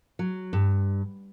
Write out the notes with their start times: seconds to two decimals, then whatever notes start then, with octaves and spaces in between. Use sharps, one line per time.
0.19 F#3
0.53 G2